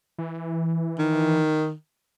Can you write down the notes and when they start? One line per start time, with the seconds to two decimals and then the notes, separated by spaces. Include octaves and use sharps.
0.18 E3
0.98 D#3